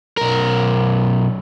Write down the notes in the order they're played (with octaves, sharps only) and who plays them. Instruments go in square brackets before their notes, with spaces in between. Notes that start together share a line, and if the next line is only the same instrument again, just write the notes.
[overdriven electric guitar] B1 A#4